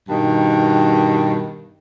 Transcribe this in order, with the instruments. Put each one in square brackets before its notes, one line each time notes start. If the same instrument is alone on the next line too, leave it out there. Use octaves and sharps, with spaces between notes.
[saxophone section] G2 B2 D#3